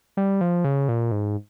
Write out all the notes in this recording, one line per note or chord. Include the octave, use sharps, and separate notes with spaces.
G3
F3
C#3
A#2
G#2